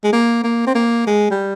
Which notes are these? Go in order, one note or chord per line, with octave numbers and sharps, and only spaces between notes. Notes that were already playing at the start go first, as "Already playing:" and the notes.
G#3
A#3
A#3
C4
A#3
G#3
G3